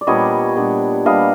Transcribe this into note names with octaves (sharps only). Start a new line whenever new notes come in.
D5
A#2 G3 B3 D4 C#5 D#5
A#2 G3 B3 D4
A#2 G3 B3 D4 D#5 F5